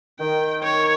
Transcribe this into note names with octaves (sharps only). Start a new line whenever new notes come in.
D#3 G5
C#5